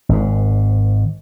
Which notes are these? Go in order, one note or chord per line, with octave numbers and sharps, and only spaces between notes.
G#1 G#2